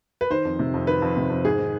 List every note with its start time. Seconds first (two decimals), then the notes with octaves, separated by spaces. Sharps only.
0.21 B4
0.30 D#3 C5
0.45 F2
0.59 C3
0.74 F2
0.87 D#3 B4
1.02 F2
1.17 C3
1.30 F2
1.45 G#2 G#4
1.59 D#3